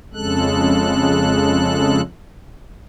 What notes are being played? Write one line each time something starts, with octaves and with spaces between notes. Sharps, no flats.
F2 C#3 G#3 A4 F#6